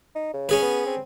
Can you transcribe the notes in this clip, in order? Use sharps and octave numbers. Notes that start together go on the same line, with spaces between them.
D#4
C#3
C#4 G#4 B4
B3
C4